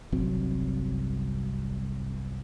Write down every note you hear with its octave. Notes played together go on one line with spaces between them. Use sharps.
G1 C2 F#3 C4